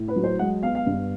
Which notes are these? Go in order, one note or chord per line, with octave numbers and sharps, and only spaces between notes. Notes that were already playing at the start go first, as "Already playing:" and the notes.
Already playing: A2
B4
F#3
C5
G#3 F#5
B3 F5
F5
G2